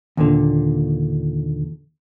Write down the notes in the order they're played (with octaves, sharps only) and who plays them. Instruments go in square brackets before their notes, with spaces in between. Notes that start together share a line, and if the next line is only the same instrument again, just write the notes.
[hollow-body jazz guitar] D#2 A#2 D3